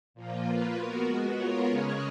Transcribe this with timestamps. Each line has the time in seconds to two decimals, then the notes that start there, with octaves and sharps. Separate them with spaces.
0.14 A#2 F3 A#3 F4
0.44 A#3 F4 B4
0.74 B3 F#4 A#4
1.05 G#3 B3 F#4
1.35 B3 F4 A#4 C#5
1.65 C#3 G#3 C#4 G#4 C#5